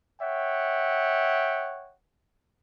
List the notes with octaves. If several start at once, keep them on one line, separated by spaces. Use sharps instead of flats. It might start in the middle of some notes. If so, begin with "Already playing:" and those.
C#5 E5 F#5 G5